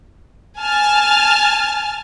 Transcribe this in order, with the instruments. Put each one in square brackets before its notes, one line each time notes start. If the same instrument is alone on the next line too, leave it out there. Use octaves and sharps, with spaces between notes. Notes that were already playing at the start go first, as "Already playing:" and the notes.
[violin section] G#5 A5 F6